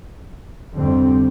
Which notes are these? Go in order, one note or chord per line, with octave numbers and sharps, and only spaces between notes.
F2 D3 G3 C4